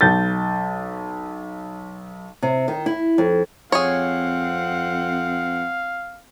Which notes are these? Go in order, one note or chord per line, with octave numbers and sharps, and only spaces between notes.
B1 G6 A6
C3
D#3
E4
F2
F2 C4 G#4 C#5 F5 F#5